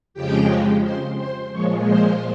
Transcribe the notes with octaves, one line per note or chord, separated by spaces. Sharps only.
F2 C#3 F3 G#3 G4 G5
C5 C6
C5 C6
A#2 F3 G#3 C#5 C#6
C5 C6